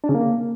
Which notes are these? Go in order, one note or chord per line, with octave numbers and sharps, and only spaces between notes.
D4
C#3
A#3